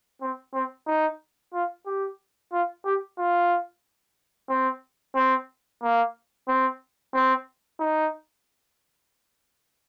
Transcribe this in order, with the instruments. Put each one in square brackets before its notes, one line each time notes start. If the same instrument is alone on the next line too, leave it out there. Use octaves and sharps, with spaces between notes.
[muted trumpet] C4
C4
D#4
F4
G4
F4
G4
F4
C4
C4
A#3
C4
C4
D#4